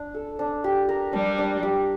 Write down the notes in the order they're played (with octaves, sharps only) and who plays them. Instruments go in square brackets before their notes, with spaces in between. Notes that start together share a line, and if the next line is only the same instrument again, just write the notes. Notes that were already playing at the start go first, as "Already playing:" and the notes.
Already playing: [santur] D4
A4
D4
G4
A#4
[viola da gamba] G3 [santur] D4
[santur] D4
G4